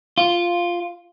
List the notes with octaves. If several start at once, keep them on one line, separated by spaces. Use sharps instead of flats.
F4